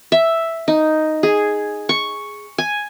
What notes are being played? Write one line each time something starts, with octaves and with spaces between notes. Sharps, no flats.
E5
D#4
G#4
C#6
G#5